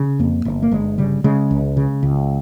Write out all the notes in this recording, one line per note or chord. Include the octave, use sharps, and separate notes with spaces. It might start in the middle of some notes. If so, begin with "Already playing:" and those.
Already playing: C#3
F2 A#3
G1
A#3
G1 G#3
C#3 G3
C#3 G#3
C#2
C#3
C#2